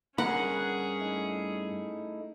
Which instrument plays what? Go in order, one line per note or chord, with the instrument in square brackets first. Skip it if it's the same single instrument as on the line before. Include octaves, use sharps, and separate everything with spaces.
[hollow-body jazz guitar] G2 A#4 B5 [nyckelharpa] C#4 G#4 [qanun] F#5
[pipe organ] A3 D#4 E4